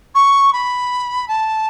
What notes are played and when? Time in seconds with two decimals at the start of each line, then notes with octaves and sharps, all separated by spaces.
0.14 C#6
0.53 B5
1.28 A5